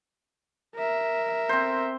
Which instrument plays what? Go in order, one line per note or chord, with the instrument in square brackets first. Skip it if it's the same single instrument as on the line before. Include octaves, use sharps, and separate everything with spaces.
[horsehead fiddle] A#4 E5
[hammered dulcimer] C4 C5